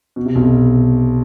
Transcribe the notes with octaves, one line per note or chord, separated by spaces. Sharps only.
B2
C3
B1 B2